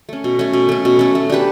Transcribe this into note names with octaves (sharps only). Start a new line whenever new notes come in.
A3 C#4
B2
A3 C#4
B2
A3 C#4
B2
A3 C#4
A3
D4 G4 B4